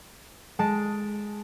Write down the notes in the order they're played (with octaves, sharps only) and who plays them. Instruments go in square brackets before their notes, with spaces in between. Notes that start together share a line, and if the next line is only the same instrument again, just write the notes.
[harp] G#3 A5 D7